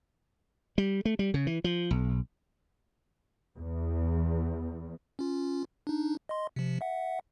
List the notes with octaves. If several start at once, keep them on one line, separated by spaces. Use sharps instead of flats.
G3
A3
G3
C#3
E3
F3
B1
E2
C#4 F4
D4 D#4
D#5 C6
C3 F3
E5 F#5